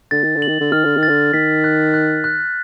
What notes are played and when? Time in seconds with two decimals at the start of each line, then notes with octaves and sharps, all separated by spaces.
0.11 D3 A6
0.24 D#3
0.36 D3
0.42 F#7
0.48 D#3
0.60 D3
0.72 D#3 F6
0.84 D3
0.97 D#3
1.03 A6
1.09 D3
1.33 D#3 B6
1.64 F#6
1.94 F#6
2.24 F#6